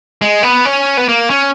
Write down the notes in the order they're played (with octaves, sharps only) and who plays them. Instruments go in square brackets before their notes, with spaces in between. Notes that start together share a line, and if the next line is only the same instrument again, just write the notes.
[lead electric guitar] G#3
B3
C#4
B3
A#3
C#4